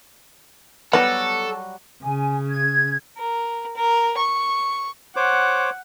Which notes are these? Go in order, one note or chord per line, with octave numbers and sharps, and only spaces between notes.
F#3 G3 B3 F#4 A4
C#3 G#5
G#6
A#4
A#4
C#6
C5 C#5 F#5 D6